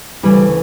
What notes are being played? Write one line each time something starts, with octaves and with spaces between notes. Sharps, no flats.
D2 C#3 E3 G3